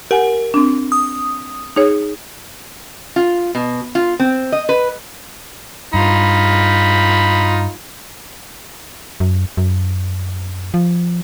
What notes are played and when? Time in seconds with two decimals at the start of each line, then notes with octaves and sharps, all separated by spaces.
0.11 G4 A#4 F#5 G#5
0.54 C4 D4
0.92 D#6
1.76 D#4 G#4 C#5
3.16 F4
3.55 B2
3.95 F4
4.19 C4
4.52 D#5
4.69 B4
5.94 G2 D#4 F4 B5
9.20 F#2
9.57 F#2
10.74 F3